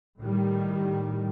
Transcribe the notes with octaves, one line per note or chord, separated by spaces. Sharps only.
A2 D#3 G3